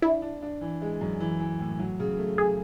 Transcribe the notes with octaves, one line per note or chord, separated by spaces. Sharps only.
D4 E4
D4
D4
E3
G#3
F#2
E3
E3
A2
F#3
C#3
A3
G#4